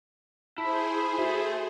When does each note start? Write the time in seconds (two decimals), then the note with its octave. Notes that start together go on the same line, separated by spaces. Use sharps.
0.58 E4 G#4 C5 A5 B5
1.18 F#4 A4 E5